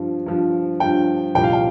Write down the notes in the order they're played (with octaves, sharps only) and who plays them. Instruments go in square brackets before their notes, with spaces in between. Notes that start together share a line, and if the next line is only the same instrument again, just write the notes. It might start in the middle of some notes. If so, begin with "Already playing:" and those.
Already playing: [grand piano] G2 F3
G2 F3
G2 F3 G5
C2 A#2 F3 G5
F5
G5